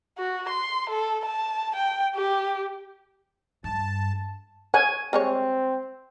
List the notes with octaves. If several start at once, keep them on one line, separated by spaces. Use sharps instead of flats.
F#4
C6
A4
A5
G5
G4
G2 A5
C#5 F#5 G#5
G3 G#3 C4 C#5